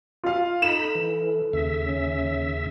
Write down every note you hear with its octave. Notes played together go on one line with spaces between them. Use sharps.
F4 F5
D#4 A4 B5 E7
E3
D#2 C#3 E5
C#4